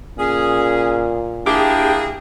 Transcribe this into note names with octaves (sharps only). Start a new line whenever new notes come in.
A#2 C#4 G#4
A#3 D4 E4 G4 G#4